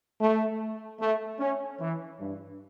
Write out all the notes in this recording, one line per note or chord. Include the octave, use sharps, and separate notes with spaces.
A3
A3
C#4
E3
G2